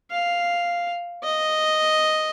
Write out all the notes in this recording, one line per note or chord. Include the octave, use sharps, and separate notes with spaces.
F5
D#5